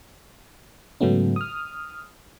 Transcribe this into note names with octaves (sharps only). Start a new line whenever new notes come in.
G#2 C#3 F#3 A3 B3 C#4
D#6 F6